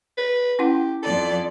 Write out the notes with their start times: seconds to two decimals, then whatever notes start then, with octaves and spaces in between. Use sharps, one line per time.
0.17 B4
0.59 C#4 E4 G4 F#5
1.03 F2 A4 D5